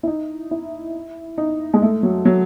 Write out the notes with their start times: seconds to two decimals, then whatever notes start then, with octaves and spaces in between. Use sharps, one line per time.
0.03 E4
0.07 D#4
0.51 E4
1.38 D#4
1.74 G#3
1.82 A3
2.03 F#3
2.25 F#3